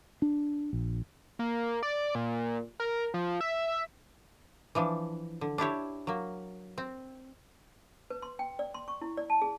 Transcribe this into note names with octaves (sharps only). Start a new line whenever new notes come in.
D4
A#1
A#3
D5
A#2
A#4
F3
E5
E3 F3 D4
D3
D4 E4 G4 C#5
F#3 A#3
C4
B4
C6
G5
D5
C6
C#6
E4
D5
A5
G#4